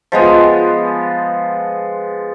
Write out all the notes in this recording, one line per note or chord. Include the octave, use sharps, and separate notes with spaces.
F3 G#3 B3